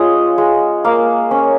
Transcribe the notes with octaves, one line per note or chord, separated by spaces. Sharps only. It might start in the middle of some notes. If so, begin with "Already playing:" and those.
Already playing: G#3 C#4 F4 C#5 D#5
G#3
A#3 F5
C#4